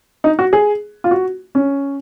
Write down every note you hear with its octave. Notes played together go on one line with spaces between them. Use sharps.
D#4
F#4
G#4
F4
F#4
C#4